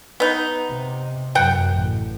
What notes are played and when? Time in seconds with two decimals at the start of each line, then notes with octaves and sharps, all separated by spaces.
0.20 B3 D#4
0.70 C3
1.35 F#2 C3 F#5 G5
1.72 A1